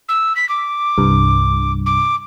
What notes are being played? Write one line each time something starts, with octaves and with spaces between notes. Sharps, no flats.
E6
B6
D6
C2 G2
D6